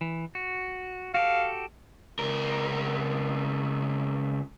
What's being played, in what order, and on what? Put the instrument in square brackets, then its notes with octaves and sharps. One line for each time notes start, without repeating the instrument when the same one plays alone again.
[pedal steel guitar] E3
F#4
[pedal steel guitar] F#4 G4 A4 [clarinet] F5
[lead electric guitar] C#2 A#4